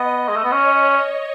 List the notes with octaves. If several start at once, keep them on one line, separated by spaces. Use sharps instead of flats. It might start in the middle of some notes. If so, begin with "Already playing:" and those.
Already playing: B3 D#5
D#5
G#3
A3
B3
C#4 C#5